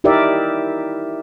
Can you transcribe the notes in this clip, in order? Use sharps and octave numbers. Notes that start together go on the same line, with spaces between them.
D#4 E4 G4 A#4 D5 E5